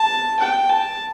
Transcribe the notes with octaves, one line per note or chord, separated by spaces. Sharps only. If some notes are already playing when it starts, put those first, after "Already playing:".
Already playing: A5
G5
A5